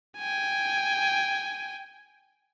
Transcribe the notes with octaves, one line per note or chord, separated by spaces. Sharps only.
G5 G#5